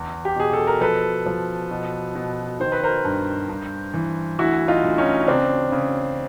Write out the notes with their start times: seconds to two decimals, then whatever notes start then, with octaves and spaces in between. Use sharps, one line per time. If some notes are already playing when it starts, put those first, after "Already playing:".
Already playing: E2
0.25 G4
0.36 B2 G#4
0.53 A4
0.67 A#4
0.81 F3 A4 B4
1.26 F3
1.71 B2
2.15 B2
2.59 D#3 C5
2.72 B4
2.83 A#4 C5
3.05 G2
3.49 G2
3.94 E3
4.39 D2 E4 F#4
4.68 D#4 F4
4.84 D2
4.98 C#4 D#4
5.28 C#3 C4 D4
5.72 C#3